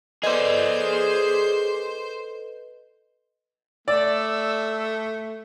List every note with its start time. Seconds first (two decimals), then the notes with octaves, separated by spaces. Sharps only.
0.23 G#4 A4 B4 C5 D5 D#5
3.88 A3 D5 E6